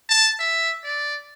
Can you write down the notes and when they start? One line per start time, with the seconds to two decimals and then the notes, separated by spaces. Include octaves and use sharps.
0.09 A5
0.39 E5
0.84 D5